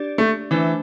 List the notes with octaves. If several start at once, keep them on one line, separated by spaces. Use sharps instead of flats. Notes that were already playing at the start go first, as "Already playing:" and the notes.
Already playing: D4 G4 D5
A3
E3 A3 D4 C5 E5